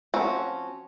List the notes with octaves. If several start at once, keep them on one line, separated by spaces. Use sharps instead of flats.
F3 C4 C#4 F#4